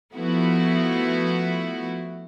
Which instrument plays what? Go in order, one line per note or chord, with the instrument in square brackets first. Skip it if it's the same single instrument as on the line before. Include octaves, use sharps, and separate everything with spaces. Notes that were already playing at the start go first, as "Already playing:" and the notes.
[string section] F3 A3 B3 E4 F#4